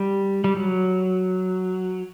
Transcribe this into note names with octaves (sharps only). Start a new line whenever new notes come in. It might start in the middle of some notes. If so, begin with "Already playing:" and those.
Already playing: G3
G3
F#3